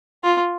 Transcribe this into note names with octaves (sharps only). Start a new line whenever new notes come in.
F4